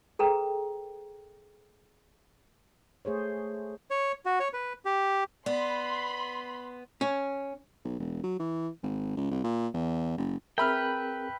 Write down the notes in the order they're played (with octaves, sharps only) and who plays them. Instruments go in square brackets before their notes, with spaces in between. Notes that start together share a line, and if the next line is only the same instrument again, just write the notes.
[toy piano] G#4 A4 B4 G5 A#5
[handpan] A3 G#4 C5 C#5
[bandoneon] C#5
F#4
C#5
B4
G4
[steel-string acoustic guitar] B3 [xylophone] D5 [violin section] B5 C6
[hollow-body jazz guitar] C#4
[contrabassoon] B1
E1
F#3
E3
G#1
C#2
C2
A#2
E2
F#1
[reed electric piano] C4 G#4 A#4 [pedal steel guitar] B4 G5 [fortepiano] E5 B5 F6